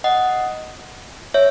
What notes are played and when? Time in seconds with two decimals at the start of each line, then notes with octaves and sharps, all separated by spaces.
0.04 D#5 F#5
1.34 C#5 E5